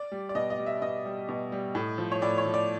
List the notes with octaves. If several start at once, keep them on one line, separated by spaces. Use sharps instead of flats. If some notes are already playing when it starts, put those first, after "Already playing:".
Already playing: D5
G3
D5
B2 D#5
D#5
G3
E5
B2 D#5
G3
B2
G3
A2
F3
C#5
A2 D5
C#5
F3
D5